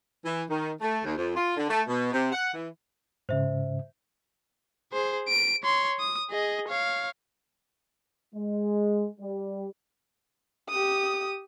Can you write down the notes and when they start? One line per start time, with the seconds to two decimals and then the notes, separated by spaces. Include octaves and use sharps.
0.25 E3
0.50 D#3
0.81 A3
1.04 D#2
1.17 F2
1.36 F4
1.57 D3
1.70 A3
1.88 B2
2.13 C3
2.32 F#5
2.54 E3
3.29 G#2 C#3 C5 E5
4.92 G#4 C5
5.28 D7
5.63 C#5 C6
6.00 D#6
6.30 G#4 D#5
6.68 C#5 F5
8.35 G#3
9.21 G3
10.69 G4 D#6